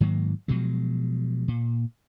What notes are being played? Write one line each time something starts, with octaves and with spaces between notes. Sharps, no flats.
G#2 D#3 F#3 A#3
B2 F3 F#3 G#3
A#2